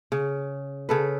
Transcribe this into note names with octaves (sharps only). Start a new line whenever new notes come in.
C#3
C#3 A4 B4